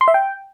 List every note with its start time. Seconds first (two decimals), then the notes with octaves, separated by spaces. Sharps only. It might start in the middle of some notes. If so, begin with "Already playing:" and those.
0.01 C6
0.08 E5
0.14 G5